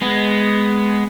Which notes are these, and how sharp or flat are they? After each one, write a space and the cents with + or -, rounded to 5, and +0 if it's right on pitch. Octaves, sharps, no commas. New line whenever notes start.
G#3 +0 B3 +10